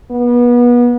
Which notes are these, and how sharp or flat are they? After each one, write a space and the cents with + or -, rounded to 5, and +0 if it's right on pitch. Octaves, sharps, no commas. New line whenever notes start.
B3 -30